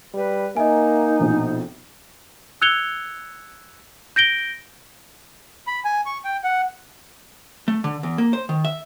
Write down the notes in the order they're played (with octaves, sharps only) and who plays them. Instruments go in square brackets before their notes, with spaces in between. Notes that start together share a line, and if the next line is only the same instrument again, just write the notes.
[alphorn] G3 [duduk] B4
[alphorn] A#3 [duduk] D#4 [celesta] D#5 G#5 [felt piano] E5
[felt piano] A#1 F2 B2
[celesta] E6 F#6 G#6 C#7 F7 G7
G6 A#6 D7 G7
[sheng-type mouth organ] B5
G#5
C#6
G5
F#5
[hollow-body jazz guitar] A3
D3
E2
A#3
C5
D#3
E5